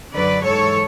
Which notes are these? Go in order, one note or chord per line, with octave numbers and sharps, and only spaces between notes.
F#2 D3 F#3 B4 D5
G#2 E3 A4 C#5